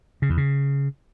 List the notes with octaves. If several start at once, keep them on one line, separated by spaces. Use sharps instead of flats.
C#3
E2
C#3